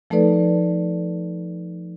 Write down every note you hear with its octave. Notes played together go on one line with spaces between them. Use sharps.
F3 A3 D#4 A4 B4 D5